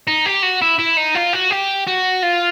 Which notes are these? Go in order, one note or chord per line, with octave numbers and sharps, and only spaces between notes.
D#4
G4
F#4
E4
E4
D#4
F4
F#4
G4
F#4
F4